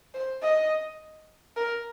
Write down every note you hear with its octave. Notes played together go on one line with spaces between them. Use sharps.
C5
D#5
A#4